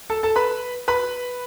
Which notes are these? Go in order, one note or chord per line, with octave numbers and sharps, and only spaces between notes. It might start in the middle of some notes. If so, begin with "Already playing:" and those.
A4 A5
A4 A5
B4 B5
B4 B5